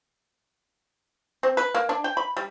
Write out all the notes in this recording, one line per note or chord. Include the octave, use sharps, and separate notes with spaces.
C4
B4
A#3
D4
G5
B5
G3